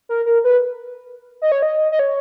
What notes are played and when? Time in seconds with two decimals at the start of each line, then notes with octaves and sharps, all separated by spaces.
0.09 A#4
0.26 A#4
0.44 B4
1.42 D#5
1.52 C#5
1.62 D#5
1.92 D#5
1.99 C#5